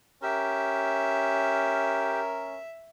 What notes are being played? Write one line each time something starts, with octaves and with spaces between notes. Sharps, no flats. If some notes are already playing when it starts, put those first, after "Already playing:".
C#4 G4 A#4 E5